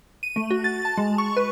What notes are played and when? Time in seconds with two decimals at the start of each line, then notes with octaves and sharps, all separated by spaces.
0.23 D#7
0.36 A3
0.51 F#4
0.64 A6
0.85 A5
0.97 G#3
1.18 C#6
1.36 B4